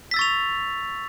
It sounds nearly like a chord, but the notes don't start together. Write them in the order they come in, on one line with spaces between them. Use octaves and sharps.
B6 E6 A6 C#6 F7